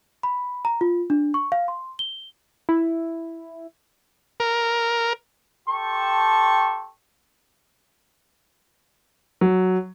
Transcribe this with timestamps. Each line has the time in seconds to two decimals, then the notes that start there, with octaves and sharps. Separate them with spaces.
0.23 B5
0.65 A#5
0.81 F4
1.10 D4
1.34 C#6
1.52 F5
1.68 C6
1.99 G7
2.69 E4
4.40 A#4
5.68 G4 A4 G5 A5 C6 C#6
9.41 F#3